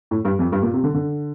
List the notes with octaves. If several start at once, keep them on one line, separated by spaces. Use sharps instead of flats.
A2
G2
F2
G2
A#2
C3
D3
D3